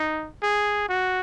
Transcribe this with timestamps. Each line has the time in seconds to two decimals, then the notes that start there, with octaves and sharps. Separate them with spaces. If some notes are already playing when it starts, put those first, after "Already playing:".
Already playing: D#4
0.43 G#4
0.89 F#4